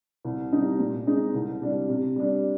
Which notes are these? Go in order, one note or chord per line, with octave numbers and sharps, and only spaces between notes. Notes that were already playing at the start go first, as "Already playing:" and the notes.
C2
C3 G3 C4 D#4
A#2
G#3 C4 D#4
C2
C3 G3 D4
C3
G3 D4